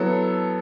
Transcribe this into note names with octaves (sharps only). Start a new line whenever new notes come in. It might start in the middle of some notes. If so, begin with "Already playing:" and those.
Already playing: F#3 B3 E4 A4